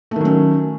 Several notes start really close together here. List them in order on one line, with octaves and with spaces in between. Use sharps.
A3 D#3 F#3 C#4